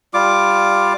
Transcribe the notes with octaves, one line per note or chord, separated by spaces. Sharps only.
G3 F4 D6